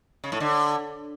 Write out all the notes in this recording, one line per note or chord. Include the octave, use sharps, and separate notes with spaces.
C#3
A2
D3